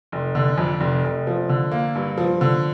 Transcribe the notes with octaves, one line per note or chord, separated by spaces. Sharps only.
F1
D3
F2
F1
F1
F3
D3
A#3
G2
F3
D3